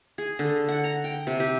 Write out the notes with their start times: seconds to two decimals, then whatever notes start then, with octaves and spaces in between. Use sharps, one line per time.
0.18 G#4
0.39 D3
0.68 F#5
0.84 A#5
1.04 G5
1.27 C3
1.40 G4